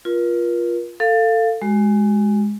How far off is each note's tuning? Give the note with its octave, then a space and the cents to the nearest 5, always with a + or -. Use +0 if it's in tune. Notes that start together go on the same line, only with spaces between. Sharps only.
F4 +0 A#4 +40
A4 +20 F5 -5
G#3 +0 F#4 +35